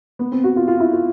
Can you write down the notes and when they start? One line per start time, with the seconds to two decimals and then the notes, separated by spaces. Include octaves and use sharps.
0.19 B3
0.32 C4
0.43 F#4
0.56 F4
0.68 F4
0.80 E4
0.93 F4